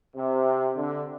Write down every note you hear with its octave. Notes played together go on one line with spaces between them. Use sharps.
C3
D3